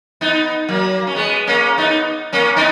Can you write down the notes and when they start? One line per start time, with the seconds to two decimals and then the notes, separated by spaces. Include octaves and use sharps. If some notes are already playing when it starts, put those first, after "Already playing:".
0.21 B3 D#4
0.69 F#3 A#3
1.07 C#4
1.15 G#3 B3
1.47 A#3 C#4
1.78 B3 D#4
2.33 A#3 C#4
2.57 B3 D#4